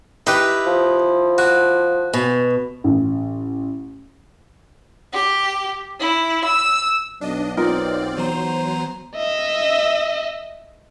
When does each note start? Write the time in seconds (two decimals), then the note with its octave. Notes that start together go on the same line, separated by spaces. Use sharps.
0.27 D#4 E4 G4 B4
0.67 F3
1.38 F#4
2.14 B2
2.84 A1
5.12 G4
5.98 E4
6.44 E6
7.21 B1 D4 D#5
7.57 C4 D#4 F4 A#4 D5 F6
8.17 E3 F#3 B3 C5 A#5
9.16 D#5 E5